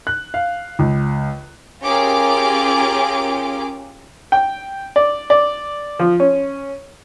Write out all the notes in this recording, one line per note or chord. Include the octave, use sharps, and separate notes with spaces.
F#6
F5
C#2
C#4 F4 G4 G#4 A#4 D6
G5
D5
D5
F3
C#4